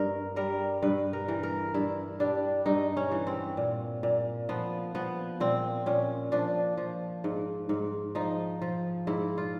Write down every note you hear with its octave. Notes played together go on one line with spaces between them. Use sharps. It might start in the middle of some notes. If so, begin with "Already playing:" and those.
Already playing: G2 A#4
G3 A#4
G2 B4
A#4
E3
A#4
G2 E4
G3 D4
G2 D#4
C#4
E3
C4
A#2
A#2
F3 B3
F3 B3
A#2 C4
A#2 C#4
F3 D4
F3
G#2
G#2
F3 D#4
F3
G#2 E4
F4